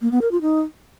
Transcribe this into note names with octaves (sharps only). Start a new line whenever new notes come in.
A#3
B3
A#4
F4
D#4